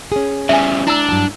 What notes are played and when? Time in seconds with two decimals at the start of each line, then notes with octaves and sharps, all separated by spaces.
0.12 C#4 G#4
0.49 C#3 G3 E5 G#5
0.87 D4 E4 A#5 E6
1.09 G2 F#3 A5